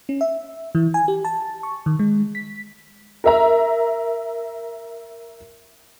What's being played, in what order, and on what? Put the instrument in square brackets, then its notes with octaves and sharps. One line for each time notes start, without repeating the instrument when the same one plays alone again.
[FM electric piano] C#4
E5
E3
G#5
G4
A5
C#6
D#3
G#3
B6
[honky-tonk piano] A#4 E5 A#5